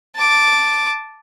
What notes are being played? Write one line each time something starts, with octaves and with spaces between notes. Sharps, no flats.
A5 D6